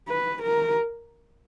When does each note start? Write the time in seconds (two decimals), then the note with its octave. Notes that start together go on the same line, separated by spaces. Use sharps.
0.08 B4
0.43 A#4